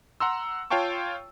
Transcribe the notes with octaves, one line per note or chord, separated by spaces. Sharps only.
F#5 A#5 C6 E6
F4 C#5 F5 G5 A5 C#6